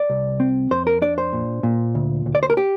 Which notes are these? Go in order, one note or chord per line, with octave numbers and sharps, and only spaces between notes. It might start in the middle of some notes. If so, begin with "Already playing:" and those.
Already playing: D5
C2
C4
F2 C5
A#4
D4 D5
C5
A#2
A#2
D2
D2
D5
C5
A#4
G4